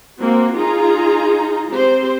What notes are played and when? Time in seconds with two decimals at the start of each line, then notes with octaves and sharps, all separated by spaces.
0.19 A#3 C4 F#4
0.55 D#4 F4 G#4 A#5
1.70 C4 G4 C5